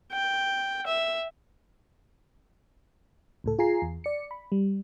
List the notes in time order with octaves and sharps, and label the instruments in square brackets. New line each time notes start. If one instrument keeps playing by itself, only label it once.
[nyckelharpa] G5
E5
[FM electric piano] C#2 A2 A4
F4 G#4 G#5 A#5 C7
E2
D5 C#7
B5
G3